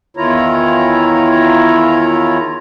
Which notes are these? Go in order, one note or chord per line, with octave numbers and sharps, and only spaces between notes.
E2 D#3 E4 F4 C#5 A#5